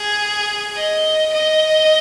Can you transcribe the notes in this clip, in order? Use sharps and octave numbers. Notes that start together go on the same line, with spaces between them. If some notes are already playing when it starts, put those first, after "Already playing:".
Already playing: G#4
D#5
D#5